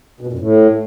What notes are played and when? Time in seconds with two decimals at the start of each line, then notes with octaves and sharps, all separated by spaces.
0.21 B2
0.27 A#2
0.33 F#2
0.39 A2